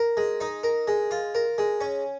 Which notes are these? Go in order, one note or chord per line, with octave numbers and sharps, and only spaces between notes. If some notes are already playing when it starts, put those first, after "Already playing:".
Already playing: A#4
G#3
D#4
A#4
G#3
F4
A#4
G#3
C#4